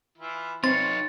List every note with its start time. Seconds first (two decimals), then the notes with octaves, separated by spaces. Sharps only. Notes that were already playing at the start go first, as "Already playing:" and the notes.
0.18 E3 E4 F4
0.64 C4 D#4 F4 B4 C#5 A6